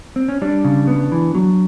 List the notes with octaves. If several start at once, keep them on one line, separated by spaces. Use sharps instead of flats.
C4
C#4
G3 D4
C#3
B3
E3
F#3